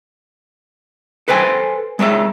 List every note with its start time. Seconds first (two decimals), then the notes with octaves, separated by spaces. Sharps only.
1.28 A4 B4 C5 G5 G#5
1.99 G#3 A#4 C#5 E5